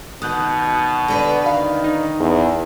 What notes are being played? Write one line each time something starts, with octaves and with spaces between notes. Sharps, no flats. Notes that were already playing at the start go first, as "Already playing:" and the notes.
B2 D#3 D#6 F#6 G6
D3 B4 D5
D#3 F5
D#4
E2